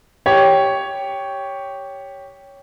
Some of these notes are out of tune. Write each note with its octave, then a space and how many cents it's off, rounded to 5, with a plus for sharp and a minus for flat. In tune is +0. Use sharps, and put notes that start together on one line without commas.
G4 +0 C#5 +5